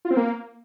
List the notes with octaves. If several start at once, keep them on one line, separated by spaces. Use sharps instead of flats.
F4
C4
A#3